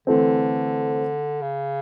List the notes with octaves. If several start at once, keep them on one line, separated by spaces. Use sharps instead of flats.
D3 E3 A3 C4
C#3